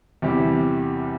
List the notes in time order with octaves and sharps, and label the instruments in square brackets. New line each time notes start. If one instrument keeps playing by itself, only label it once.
[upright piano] E2 C3 G3 E4 G4